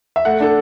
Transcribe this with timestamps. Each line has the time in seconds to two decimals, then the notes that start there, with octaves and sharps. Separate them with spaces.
0.16 E5
0.25 A3 F#5
0.40 D4 A4